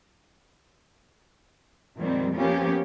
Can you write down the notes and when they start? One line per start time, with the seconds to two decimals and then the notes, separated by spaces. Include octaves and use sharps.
1.97 F2 A#2 D#3 G3 G#3 C4
2.35 F3 A#3 B3 C#4 G4